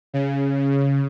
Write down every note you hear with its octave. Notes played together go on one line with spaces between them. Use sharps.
C#3